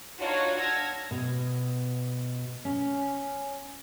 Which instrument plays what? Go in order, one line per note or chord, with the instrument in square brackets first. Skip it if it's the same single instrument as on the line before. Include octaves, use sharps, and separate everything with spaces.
[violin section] D4 D#4 F4 F#4 C#5 F#5
A5 E6 F6 G#6 A#6
[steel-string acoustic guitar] B2
C#4